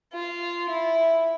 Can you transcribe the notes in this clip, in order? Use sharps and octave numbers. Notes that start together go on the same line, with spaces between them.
F4
E4